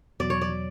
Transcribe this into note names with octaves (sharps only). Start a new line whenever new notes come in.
E2 B2 F#3 D5
C#5
D5
B2 F#3